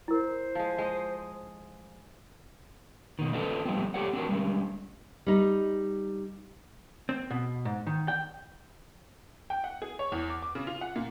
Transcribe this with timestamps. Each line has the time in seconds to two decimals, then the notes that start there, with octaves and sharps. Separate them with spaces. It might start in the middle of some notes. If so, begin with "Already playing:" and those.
0.08 E4 A#4 C5
0.55 F3 G#3
0.78 G#3 D#5
3.19 B2 D#3
3.33 C#4 F4 A4 B4 D5 D#5
3.65 F3 G3 A3 B3 C4
3.94 A3 C4 G4 C#5 D5 F#5
4.13 C4 D4 F#4 A#4
4.29 G3 G#3 C#4
5.27 G3 D#4
7.09 C4
7.31 B2
7.65 G#2
7.87 D#3
8.08 G5
9.50 G5
9.64 F#5
9.82 G#4
9.99 C#5
10.12 E2
10.30 D6
10.42 D6
10.55 C#3
10.67 F4
10.81 F#5
10.96 A#2